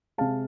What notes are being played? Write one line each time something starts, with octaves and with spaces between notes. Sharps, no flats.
C3 G#3 F5 A5